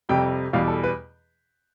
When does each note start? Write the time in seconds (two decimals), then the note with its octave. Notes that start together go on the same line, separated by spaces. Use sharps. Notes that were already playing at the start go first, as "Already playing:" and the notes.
0.09 F2 C3 G3 G5
0.53 E2 B2 G3 F5
0.68 A4
0.84 B4